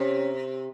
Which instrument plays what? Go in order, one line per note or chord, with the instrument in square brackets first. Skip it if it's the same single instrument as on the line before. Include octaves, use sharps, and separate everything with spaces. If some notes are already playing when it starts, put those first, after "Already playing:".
Already playing: [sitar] C3 [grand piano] C#4